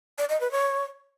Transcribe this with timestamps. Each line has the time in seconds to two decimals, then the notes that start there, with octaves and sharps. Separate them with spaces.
0.18 D5
0.29 D#5
0.40 B4
0.52 C#5